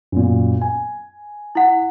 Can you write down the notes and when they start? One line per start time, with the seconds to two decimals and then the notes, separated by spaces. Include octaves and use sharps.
0.12 F#2 A#2
0.61 G#5
1.55 E4 F#5